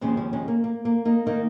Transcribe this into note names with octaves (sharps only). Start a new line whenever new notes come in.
D#2 C#3 F3 G#3 C#4
G#3 C#4
G#3 C#4
A#3
A#3
A#3
A#3 D#4
D#3 A#3 D#4